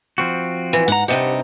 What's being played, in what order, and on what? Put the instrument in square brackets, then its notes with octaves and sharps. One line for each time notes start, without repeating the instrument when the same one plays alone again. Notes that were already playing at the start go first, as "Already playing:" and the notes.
[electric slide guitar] F3 C4 F#4
[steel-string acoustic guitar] E3
[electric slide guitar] G#2 A#5 [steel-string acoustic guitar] F#5
[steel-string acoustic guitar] G2 C3 D#4 [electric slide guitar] G4 C5 F#5